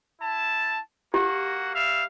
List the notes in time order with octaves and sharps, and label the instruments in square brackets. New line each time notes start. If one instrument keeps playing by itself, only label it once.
[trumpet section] E4 A5
[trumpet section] A#3 F#4 F#5 [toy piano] G4
[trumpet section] G3 E5 F5